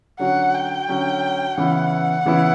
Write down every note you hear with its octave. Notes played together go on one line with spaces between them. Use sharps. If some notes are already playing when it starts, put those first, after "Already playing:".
D3 F#3 C#4 F#4 F#5
G5
D3 F#3 C#4 F#4
C#3 E3 B3 E4 F#5
C#3 E3 B3 E4